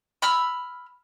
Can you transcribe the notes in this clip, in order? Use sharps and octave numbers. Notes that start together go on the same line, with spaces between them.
B5 E6 F6